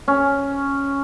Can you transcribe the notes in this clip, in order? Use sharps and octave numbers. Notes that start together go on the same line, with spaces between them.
C#4